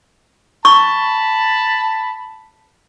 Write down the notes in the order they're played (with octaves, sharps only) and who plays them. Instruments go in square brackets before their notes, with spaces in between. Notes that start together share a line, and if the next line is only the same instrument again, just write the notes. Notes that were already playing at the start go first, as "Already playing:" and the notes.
[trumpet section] A5 B5 [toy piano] C#6